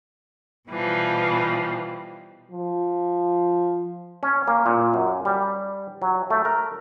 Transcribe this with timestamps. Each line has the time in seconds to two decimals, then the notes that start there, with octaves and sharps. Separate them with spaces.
0.69 B2 E3 F3 G3
2.51 F3
4.23 C#4
4.48 A#3
4.66 A#2
4.94 F#2
5.25 G3
6.02 F#3
6.30 A3
6.45 A#4